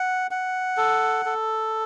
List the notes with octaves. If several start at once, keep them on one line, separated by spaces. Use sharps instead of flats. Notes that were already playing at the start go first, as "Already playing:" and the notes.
Already playing: F#5
F#5
A4
A4